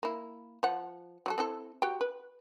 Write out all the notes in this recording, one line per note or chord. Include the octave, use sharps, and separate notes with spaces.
A#3 E4
F3 F#5
F#3 F#4 A4
C4 E4 A4
F#4 G4 G5
B4